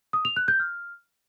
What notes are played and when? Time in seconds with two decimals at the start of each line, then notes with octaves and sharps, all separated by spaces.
0.13 D#6
0.25 F7
0.36 F#6
0.48 G6
0.60 F6